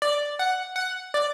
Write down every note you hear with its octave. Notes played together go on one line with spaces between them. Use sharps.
D5
F#5
F#5
D5